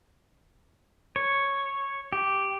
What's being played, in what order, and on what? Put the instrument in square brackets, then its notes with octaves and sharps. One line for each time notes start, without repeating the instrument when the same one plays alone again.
[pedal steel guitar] C#5
G4